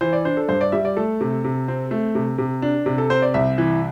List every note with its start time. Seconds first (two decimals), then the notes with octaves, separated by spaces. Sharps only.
0.01 E3 C5
0.13 D5
0.25 D4 C5
0.37 A4
0.49 G2 C5
0.61 D5
0.72 G3 E5
0.85 D5
0.97 A3 A4
1.21 C3
1.44 C3
1.68 C4
1.91 A3
2.15 C3
2.38 C3
2.62 D4
2.86 C3
2.98 A4
3.10 C4 C5
3.22 D5
3.34 C2 E5
3.58 E3